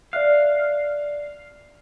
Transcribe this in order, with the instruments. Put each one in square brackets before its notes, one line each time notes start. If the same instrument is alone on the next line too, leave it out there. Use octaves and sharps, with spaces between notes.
[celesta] D5 E5 F#6 [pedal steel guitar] F5